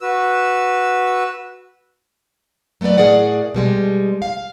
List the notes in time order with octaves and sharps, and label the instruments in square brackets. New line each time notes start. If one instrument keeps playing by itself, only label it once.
[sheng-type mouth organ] F#4 B4 E6
[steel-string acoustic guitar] F#3 A3 B3 B4 D5
A2 D#4 G#4 A#4 D5 F#5
B2 G3 G#3
F5